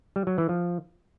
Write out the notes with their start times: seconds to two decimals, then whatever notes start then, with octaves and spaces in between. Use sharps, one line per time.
0.16 G3
0.27 F#3
0.38 E3
0.49 F3